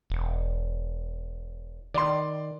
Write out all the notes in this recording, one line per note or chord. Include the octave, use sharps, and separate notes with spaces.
E1
D#3 D5 C6